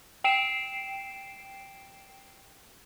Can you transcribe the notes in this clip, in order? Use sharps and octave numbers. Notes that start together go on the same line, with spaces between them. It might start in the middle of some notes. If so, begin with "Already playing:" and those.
G5 C7 D7 E7